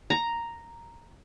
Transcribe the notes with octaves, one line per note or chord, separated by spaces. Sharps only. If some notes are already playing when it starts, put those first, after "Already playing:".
A#5